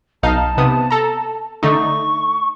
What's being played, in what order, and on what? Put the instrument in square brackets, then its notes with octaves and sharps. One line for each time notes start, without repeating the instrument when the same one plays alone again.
[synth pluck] B1 D#4 F5 [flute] A5
[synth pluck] C3 B3 D#6
A4 A#5
[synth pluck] D3 A3 D#4 [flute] C#6